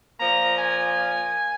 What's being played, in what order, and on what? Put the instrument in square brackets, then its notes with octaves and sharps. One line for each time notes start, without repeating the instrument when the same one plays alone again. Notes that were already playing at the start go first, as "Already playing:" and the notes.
[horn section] A#2 F3 A#3 A#5
G#5